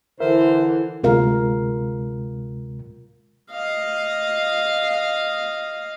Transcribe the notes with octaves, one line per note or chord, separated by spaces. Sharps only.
D3 E3 A#4 C5 E5
D2 C3 G#3 F4 A#4 F5
D#5 F5